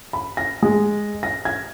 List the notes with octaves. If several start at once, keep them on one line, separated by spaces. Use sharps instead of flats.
B5
A#6
G#3
A#6
G#6